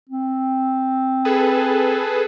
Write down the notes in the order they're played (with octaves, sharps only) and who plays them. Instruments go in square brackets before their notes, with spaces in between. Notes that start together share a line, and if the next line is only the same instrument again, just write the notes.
[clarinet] C4
[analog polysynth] G#4 A4 B4